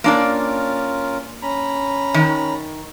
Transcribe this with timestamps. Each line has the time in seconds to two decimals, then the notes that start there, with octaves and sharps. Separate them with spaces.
0.04 A#3 C#4 D4 F4 A#4 D5
1.42 C#4 A#5 B5
2.14 D#3